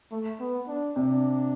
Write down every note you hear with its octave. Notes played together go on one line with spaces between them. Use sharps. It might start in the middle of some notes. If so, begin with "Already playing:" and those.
A3
B3
D4
C3 D4